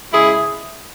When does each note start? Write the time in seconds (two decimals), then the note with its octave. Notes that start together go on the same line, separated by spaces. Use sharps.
0.11 C#3 G#3 E4 G#4